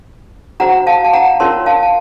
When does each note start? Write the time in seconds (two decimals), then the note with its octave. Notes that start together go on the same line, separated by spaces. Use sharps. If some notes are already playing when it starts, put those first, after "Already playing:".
0.60 F#4 C5 F#5 A#5
0.87 F5 A5
1.04 A5
1.13 F#5 A#5
1.40 C#4 F4 A#4 C#5 A5 C6
1.66 F5 A5
1.83 A5